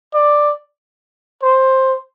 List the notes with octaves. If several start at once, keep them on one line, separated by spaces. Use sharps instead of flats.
D5
C5